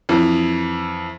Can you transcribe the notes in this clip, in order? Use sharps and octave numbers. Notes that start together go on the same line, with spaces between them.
F2 E3